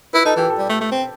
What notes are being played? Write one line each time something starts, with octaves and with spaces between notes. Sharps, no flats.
E4 B4
D#4 A4
E3 G4
A4
G3
A3
A3
C4